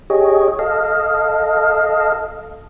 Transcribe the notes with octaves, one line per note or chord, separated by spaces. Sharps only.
G4 G#4 C#5 D#5
A4 D#5 F5